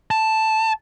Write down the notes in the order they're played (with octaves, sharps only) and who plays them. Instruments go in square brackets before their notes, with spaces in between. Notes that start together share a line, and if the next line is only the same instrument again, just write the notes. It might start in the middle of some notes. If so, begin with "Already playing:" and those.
[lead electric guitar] A5